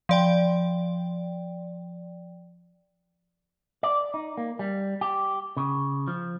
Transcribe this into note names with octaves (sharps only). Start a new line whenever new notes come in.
F3 D5 G5
D5
D#4
A#3
G3
G4
C#3
F3